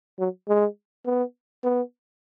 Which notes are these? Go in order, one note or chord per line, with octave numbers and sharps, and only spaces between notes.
F#3
G#3
B3
B3